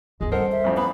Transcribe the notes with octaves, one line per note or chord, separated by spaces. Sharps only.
G1 D2 G#3
G3 A4 A#4 C5 D#5 F#5
E5
A1 F2
B3 B5